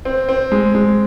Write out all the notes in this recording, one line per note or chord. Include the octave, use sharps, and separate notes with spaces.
C4
C4
G#3
G#3